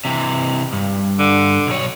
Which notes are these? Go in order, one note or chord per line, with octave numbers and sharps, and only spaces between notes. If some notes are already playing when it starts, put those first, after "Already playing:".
C3 E3
G2
D3
B1 C#5